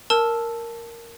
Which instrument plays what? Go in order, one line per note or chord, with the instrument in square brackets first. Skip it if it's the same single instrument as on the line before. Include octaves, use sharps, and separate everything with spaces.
[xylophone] A#4 A5 E6